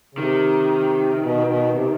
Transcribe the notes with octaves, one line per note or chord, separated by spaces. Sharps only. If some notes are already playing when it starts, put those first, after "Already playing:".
C#3
C3 D#3
B2
B2
C3